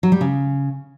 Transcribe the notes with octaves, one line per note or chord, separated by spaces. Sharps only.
F#3
G3
C#3